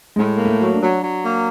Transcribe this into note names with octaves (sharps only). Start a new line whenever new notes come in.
A2 G#3
A#3
A3
F#3
D4
F#3
F#3
A#3